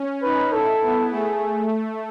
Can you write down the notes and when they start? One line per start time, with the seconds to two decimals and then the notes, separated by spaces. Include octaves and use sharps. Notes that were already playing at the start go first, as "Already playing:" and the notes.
Already playing: C#4
0.23 D#4 B4
0.52 E4 A4
0.82 B3
1.11 A3 G#4